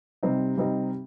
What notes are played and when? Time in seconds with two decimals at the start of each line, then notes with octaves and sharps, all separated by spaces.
0.23 C3 G3 C4 D#4
0.56 C3 G3 C4 D#4